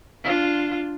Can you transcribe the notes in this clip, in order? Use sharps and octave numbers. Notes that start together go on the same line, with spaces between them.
D4 F4